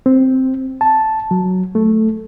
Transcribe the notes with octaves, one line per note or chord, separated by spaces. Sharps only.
C4
A5
F#3
A3